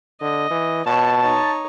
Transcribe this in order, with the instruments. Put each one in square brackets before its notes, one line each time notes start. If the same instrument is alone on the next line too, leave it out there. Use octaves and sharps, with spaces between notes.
[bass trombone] D3 [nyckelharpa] D#5
[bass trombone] E3
[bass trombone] B2 [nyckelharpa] C#5 [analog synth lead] A5
[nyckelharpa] D#4 C#5